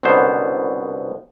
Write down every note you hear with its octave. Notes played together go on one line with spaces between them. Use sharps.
C2 F#2 B2 D3 B3 C5